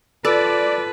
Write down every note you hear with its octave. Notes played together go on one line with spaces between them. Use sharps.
F4 A4 B4 D5 A5